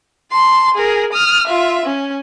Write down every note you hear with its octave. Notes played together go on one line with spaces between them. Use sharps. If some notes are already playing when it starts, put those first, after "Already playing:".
A5 C6
G#4 A#4
D#6 F6
F4 E5
C#4